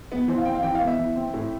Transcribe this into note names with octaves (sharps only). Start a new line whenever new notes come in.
B3
E3 C5
F5
C4 G5
F5
E3 G5
F5
B3
E5
E3
C4
A2